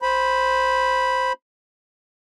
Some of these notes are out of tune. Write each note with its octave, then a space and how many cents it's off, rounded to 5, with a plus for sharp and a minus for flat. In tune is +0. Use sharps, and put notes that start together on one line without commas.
C5 +0 B5 -5